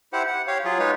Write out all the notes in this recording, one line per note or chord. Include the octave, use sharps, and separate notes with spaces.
E4 G4 C5 F#5
F#5
G4 C#5 F5
F#3 F4 G#4
G#3 D#4 B4 C#5